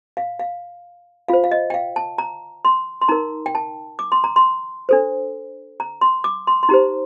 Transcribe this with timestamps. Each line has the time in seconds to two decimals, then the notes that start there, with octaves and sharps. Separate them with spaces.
0.17 F5
0.39 F5
1.28 F4 C5 F5
1.44 F5
1.51 D#5
1.70 G5
1.74 F5
1.96 A5
2.18 A#5
2.65 C6
3.01 C6
3.08 D#4 A#4 A#5
3.46 G5
3.55 A5
3.99 D6
4.12 C6
4.24 A#5
4.36 C6
4.89 D4 A4 C5
5.80 A#5
6.01 C6
6.24 D6
6.47 C6
6.63 C6
6.69 D#4 G4 C5 A#5